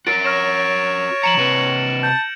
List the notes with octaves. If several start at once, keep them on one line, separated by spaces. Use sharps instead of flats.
F#4 A#4 A6 D7
C#5 F6 A#6 E7
F3 A#5 C#7 E7 F#7
C3 B4
A5 G6